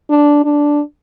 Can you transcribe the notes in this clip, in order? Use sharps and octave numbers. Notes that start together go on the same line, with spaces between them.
D4
D4